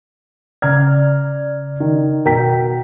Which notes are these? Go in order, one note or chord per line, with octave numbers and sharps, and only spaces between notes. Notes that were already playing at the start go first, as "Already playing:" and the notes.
C#3 D5 A#5 F6 G#6
D#3
B2 A#4 G5 A#5 B6